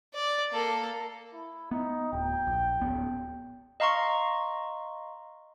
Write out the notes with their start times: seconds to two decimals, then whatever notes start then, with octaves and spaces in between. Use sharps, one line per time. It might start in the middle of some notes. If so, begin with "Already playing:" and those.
0.14 D5
0.52 A#3 A4
1.34 E4
1.71 B3 D#4
2.13 D1 G5
2.47 A#1
2.80 D1 B3
3.80 D#5 F5 A#5 C6 C#6